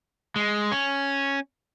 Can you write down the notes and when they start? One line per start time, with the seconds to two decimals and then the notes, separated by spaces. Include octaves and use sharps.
0.36 G#3
0.72 C#4